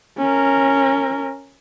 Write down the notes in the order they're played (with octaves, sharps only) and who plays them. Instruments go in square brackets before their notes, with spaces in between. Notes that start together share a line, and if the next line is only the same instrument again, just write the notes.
[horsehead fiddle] C#4 A#4